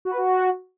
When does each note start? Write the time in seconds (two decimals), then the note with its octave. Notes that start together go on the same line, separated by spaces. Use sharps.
0.05 F#4
0.11 B4
0.17 F#4